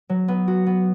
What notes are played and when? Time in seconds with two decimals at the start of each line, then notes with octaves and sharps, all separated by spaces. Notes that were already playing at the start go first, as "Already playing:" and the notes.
0.09 F#3
0.28 B3
0.48 F#4
0.66 B3